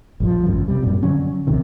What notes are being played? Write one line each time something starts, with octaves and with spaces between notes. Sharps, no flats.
A#1 G2 F3
G#1 C#2 F#2
C3 G3
F#2 A#2
D3 F#3 C#4
A#1 D#2 C3 D#3